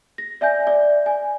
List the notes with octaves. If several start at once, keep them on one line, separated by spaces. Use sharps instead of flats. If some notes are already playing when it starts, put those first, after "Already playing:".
A#6
D5 E5 G#5 G6
D5
G#5